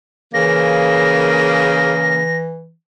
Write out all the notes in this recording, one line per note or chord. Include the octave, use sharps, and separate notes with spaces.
C#3 E3 A#3 A#6